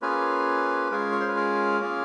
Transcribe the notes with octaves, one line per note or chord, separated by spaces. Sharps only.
A#3 C#4 F4 G#4 B4
G#3 C#4 F4 G#4 A#4
C#5
C5
B4
A#4
A#3 C#4 F4 G#4